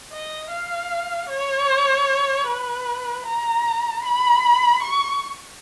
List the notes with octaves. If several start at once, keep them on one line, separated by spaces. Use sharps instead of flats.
D#5
F5
C#5
B4
A#5
B5
C#6